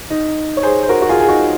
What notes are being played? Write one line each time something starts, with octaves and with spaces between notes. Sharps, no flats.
D#4
C#5
G#4 C5
C5
F#4 A#4
F#4
F4 G#4
G#4
D#4 F#4